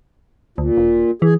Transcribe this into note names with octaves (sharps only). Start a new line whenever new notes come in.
D2 A#2
E1
E3 G#4